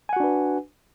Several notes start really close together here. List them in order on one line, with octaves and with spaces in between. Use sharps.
G#5 F#5 F#4 D4 B4